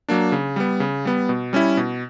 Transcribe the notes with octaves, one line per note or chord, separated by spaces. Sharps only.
F#3 A#3 D4
C#3
G3 B3
C#3
G3 B3
B2
G3 C#4 E4
B2